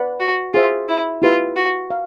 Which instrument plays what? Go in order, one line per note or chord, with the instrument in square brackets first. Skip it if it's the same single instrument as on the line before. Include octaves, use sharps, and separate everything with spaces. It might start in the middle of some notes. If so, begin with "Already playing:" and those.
Already playing: [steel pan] B4 D5 F#5 B5
[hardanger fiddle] F#4
[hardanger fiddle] F4 [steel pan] G#4 C5 E5
[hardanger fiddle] E4
[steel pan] E4 G4 B4 E5 [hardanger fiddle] F4
[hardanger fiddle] F#4
[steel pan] F5